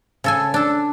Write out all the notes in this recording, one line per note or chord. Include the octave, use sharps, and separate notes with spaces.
C#3 A4 G#5
D4 A4